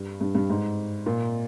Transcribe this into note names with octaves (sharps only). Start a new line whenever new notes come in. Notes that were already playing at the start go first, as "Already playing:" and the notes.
Already playing: G2
G2
G2
G#2
A#2